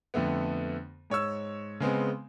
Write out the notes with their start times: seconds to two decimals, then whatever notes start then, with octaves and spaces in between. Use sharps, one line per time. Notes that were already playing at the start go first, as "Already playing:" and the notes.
0.14 F2 D3 A3 B3
1.10 G#2 C#5 C#6 E6
1.80 C#3 G#3 B3 C4